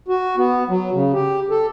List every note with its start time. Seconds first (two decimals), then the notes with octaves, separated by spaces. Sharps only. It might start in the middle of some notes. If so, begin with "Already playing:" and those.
0.08 F#4
0.37 B3
0.69 F#3
0.93 C#3
1.14 G4
1.51 A4